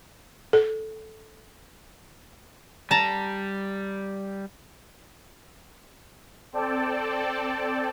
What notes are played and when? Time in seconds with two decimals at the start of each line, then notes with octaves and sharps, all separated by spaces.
0.53 A4
2.91 G3 A5 A#5
6.53 C4 A4 D5 G5 A5